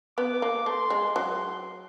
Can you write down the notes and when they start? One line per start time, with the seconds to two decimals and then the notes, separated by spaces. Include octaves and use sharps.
0.18 B3 D6
0.42 A#3
0.66 A3 C6
0.90 G#3
1.15 F#3 C6